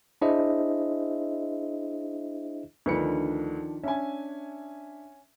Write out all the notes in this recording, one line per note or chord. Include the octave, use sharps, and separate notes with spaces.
D4 E4 G#4 C5 D#5 E5
D2 D#3 F3 D4 B4 C#7
C#4 D4 E5 G#5